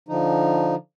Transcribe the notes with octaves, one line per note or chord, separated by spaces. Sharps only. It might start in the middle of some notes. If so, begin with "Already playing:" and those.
D3 F3 D#4